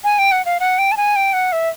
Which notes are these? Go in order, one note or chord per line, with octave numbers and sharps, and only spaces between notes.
G#5
G5
F#5
F5
F#5
G5
A5
G#5
G5
F#5
E5